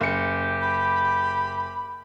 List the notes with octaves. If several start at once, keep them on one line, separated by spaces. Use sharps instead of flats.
F#1 G4 C#7
B5